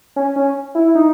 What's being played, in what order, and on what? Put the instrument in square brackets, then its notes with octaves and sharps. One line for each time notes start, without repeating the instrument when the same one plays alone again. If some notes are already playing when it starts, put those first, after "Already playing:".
[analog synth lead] C#4
C#4
E4
D#4